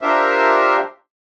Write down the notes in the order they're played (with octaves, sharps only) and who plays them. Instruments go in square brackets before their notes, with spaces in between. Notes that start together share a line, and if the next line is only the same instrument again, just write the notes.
[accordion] D4 F4 G4 A#4 C5 E5